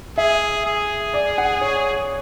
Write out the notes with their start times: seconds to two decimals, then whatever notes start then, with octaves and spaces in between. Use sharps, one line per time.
0.18 G#4 E5
0.66 G#4
1.14 D5
1.38 F#5
1.61 C#5